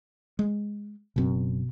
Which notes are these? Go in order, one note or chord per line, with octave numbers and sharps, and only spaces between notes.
G#3
F#1 F#2 B2 C4